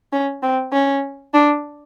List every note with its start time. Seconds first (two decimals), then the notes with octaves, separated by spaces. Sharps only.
0.13 C#4
0.43 C4
0.73 C#4
1.34 D4